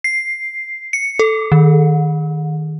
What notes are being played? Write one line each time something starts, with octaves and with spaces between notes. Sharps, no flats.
C7
C#7
A4
D#3